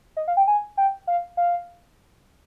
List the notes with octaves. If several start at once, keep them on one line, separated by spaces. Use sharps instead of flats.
D#5
F5
G5
G#5
G5
F5
F5